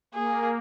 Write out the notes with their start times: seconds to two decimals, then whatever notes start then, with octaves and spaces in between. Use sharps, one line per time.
0.14 A#3 G#4